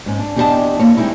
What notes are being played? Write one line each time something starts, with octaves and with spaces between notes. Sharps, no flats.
G#2 C#4
D4
E2 D4 G4 A4 D#5 A5
A#3 E4 C#5
G#3 A#3 C4 D#4 E4